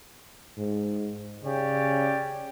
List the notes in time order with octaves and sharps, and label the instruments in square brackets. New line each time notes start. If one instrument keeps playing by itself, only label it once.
[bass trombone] G#2
[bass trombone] C#3 [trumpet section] C#4 G4 D5